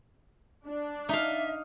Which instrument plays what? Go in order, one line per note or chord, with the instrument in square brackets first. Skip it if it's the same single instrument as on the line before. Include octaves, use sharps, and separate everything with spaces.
[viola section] D4
[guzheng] D#4 F5 [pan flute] E5